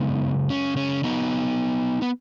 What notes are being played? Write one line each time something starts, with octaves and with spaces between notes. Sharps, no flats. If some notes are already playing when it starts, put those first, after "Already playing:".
Already playing: F#2 C#3 G#3 B3 D#4
C#4
C#4
B3 D#4
B3